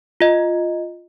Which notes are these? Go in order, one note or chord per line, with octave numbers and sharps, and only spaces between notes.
F4 D#5